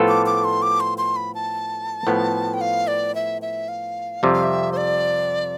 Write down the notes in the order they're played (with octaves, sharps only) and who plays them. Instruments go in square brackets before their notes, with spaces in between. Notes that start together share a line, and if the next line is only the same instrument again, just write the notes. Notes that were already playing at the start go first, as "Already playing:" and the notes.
Already playing: [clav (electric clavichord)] A2 F3 B3 F4 A4
[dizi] D6
D6
C6
D6
C6
C6
B5
A5
[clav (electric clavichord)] A2 F3 B3
[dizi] G5
F5
D5
E5
E5
F5
[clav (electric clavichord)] F2 C3 G3 [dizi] E5
[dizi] F5
E5
C5
D5